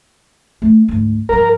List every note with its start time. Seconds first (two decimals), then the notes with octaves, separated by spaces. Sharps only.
0.62 A3 A#3
0.88 D2 G#2
1.29 G2 F3 A#4